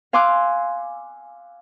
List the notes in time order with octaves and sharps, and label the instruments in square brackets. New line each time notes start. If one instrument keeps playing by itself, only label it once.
[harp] F5 G#5 C6 D6 E6 F#6